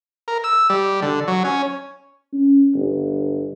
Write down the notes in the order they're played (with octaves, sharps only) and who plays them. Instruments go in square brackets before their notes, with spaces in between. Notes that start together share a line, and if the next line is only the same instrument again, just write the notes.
[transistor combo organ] A#4
E6
G3
D3
F#3
C#4
[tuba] C#4
G1